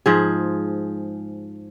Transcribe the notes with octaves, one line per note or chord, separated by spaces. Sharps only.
G#2 F3 G#4